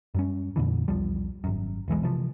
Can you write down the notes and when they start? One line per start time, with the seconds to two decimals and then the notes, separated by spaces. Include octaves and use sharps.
0.15 F#2 G3 C#4
0.56 F2 A#2 D3 E3
0.88 E1 B1 F3 G3
1.44 G#1 F#2
1.88 E1 B1 E3 G#3
2.03 C3 E3 F3